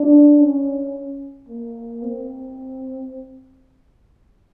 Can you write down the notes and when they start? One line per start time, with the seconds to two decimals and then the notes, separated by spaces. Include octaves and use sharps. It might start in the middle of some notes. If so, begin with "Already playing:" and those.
Already playing: D4
0.40 C#4
1.49 A#3
2.03 C4